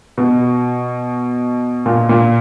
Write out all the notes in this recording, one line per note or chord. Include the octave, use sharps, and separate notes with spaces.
B2
A#2
A#2